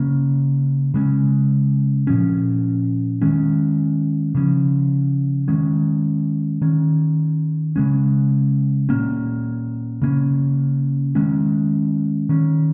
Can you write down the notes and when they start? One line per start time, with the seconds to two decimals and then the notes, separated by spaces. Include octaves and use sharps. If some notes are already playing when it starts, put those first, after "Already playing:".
Already playing: C#3 A#3 C#4
0.94 C#3 G#3 C#4
2.07 A#2 F3 C#4
3.22 D#3 G#3 C#4
4.35 C#3 F3 C#4
5.48 D#3 G#3 C#4
6.62 D#3 C#4
7.76 C#3 G#3 C#4
8.89 A#2 A#3 C#4
10.02 C#3 A#3 C#4
11.15 D#3 G#3 C#4
12.29 D#3 C#4